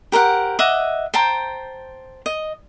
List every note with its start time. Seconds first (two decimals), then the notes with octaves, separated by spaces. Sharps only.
0.12 G4 A#4 C5 F#5
0.59 D#5 E5 F#5 D6
1.14 C5 G5 A5 A#5
2.26 D#5